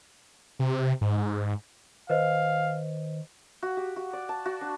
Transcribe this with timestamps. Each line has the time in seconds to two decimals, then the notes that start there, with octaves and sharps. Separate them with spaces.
0.59 C3
1.01 G#2
1.17 G#2
2.09 D#3 B4 C5 D#5 F5
3.63 F#4
3.77 G4
3.96 F#4
4.13 D5
4.29 A5
4.46 F#4
4.61 D4